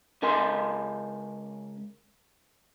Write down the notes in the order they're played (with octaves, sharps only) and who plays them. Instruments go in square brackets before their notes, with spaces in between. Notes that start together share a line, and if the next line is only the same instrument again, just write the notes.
[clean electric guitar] C#2 C#4 A#4 D#5 G#5 C6